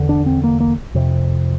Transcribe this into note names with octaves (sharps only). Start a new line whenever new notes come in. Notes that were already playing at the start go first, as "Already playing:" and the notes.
Already playing: E2 D3
D4
C4
A#3
A#3
F2 C3